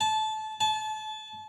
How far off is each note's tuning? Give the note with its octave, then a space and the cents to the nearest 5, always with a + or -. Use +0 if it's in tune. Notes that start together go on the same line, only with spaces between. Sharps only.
A5 -20
A5 -30